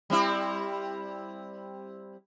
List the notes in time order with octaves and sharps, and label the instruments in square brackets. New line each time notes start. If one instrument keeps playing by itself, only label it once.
[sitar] G3 C4 E4